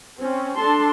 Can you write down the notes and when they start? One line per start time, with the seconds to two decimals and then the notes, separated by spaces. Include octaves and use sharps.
0.20 C4 C#4
0.58 D4 A4 A5 C6